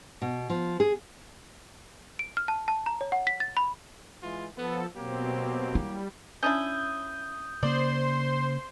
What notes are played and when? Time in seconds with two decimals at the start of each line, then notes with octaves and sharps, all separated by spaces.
0.22 B2
0.50 F3
0.80 G#4
2.19 D7
2.37 F6
2.48 A5
2.68 A5
2.86 A#5
3.01 C#5
3.12 F#5
3.27 B6
3.40 A6
3.57 B5
4.23 E3 G#3 F4
4.57 F3 B3 A4
4.97 B2 F#3 A#3 C4 G4
5.75 G3 E4
6.43 C#4 D4 E4 D#6 G6
7.63 C#3 A#3 C5 D5 C6